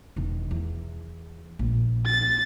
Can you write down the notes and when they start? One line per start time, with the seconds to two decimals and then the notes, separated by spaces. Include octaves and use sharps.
0.16 E1 D#3
0.51 E2
1.59 A#1
2.05 A6